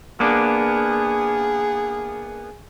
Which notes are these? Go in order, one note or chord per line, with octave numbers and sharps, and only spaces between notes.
A#3 B3 D4 G#4